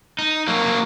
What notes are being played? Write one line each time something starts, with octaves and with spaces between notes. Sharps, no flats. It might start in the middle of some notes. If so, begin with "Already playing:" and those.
D#4
F#3 A#3